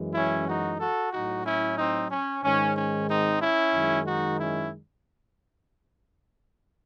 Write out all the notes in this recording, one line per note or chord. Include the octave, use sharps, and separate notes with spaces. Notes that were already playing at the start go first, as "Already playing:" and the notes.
Already playing: F#2 E3 G#3
C#4 E4
D#4 F#4
F#4 A4
A2 F#3 D#4 F#4
C#4 E4
C4 D#4
C#4
G#2 D#3 G#3 C#4
C#4
C4 D#4
C#4 E4
F#2 D#3 G#3
D#4 F#4
C#4 E4